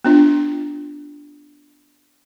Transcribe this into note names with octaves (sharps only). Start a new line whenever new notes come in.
B3 D4 F4